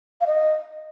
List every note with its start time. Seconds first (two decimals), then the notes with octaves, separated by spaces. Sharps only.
0.21 F5
0.26 D#5